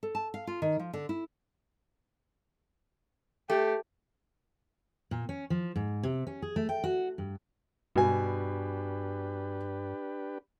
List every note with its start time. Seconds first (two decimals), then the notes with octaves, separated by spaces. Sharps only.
0.03 A4
0.15 A5
0.34 F5
0.47 F4
0.62 D#3
0.79 F3
0.93 D3
1.09 E4
3.50 A3 G4
5.11 A#2
5.29 C#4
5.50 F3
5.76 G#2
6.03 C3
6.27 C#4
6.42 G#4
6.56 A3
6.69 G5
6.84 F#4
7.18 G2
7.96 G2 B2 D4 G4 B4 G#5